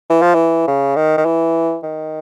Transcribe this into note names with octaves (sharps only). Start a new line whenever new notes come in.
E3
F3
E3
C#3
D#3
D#3
E3
D#3